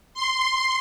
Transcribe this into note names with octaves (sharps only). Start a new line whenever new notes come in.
C6